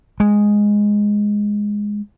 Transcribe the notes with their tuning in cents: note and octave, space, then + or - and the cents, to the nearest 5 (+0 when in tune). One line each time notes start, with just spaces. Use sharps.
G#3 -5